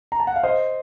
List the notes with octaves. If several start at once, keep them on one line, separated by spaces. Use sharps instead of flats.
A#5
A5
F#5
F5
C5 D#5